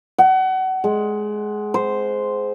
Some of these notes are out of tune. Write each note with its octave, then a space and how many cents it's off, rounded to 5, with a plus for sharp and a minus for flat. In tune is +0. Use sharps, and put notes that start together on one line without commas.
F#5 +30
G#3 +15
C5 -10